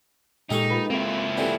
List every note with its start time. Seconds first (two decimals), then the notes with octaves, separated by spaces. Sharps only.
0.50 A#2 G#3 D#4 G4 A4 C#6
0.70 F4 B4
0.90 A#3 C4 E4
1.37 D3 E3 G4